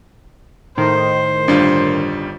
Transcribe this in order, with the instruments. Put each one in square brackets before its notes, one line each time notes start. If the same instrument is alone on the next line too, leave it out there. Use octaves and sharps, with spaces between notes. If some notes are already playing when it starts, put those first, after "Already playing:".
[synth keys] A2 D#3 [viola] C5
[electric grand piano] G1 G3 F4 [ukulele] D4